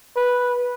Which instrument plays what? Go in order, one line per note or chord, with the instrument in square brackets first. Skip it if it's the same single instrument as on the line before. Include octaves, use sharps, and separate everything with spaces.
[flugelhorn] B4